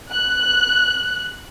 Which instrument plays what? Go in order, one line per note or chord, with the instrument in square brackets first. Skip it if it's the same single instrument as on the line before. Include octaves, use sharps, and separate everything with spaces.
[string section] F#6